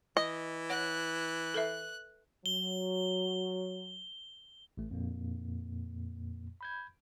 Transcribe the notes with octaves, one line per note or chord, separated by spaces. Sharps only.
E3 D#5
C#5 F#5 F#6
A4 B4 E5
F#3 G7
A1 A3
F2 A#2 A#3
B5 G6 G#6